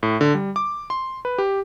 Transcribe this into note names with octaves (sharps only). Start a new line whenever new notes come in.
A2
D3
G3
D6
C6
B4
G4